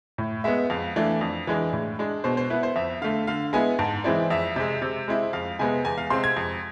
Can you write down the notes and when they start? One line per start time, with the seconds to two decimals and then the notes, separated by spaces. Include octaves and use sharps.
0.18 A2
0.44 G#3 B3 E5
0.70 F2 F5
0.96 E3 A3 D4
1.21 F2
1.47 E3 G#3 D4
1.73 A2
1.99 G#3 D4
2.24 B2 C5
2.37 C5
2.50 B3 E4 B4
2.63 C5
2.76 F2 E5
3.02 D3 A3 F5
3.27 D3 F5
3.53 G#3 B3 E4 G#5
3.79 G#2 A5
4.04 E3 G#3 C4 E4 D5
4.30 F2 E5
4.56 C3 G#3
4.82 C3
5.08 G#3 C4 E4
5.33 F2 F5
5.59 C3 G#3 B3 G#5
5.85 E2 G#5
5.98 F5
6.10 C3 G#3 C4 C6
6.24 G#6
6.37 F2